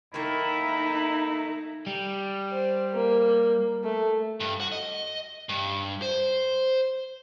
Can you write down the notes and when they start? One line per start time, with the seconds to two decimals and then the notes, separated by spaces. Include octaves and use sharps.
0.14 D#3 A3 A#3 D#4 E4 E5
1.86 G3
2.51 C5
2.94 A#3
3.84 A3
4.40 G2
4.60 F#4
4.72 D#5
5.49 G2
6.02 C5